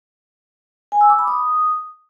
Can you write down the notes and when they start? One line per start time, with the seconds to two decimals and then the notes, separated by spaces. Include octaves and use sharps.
0.92 G#5
1.01 E6
1.10 D6
1.19 B5
1.28 D#6